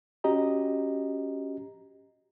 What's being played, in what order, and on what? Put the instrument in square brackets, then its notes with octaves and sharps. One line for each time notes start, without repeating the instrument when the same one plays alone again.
[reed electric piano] C#4 F#4 G4 D#5 A#5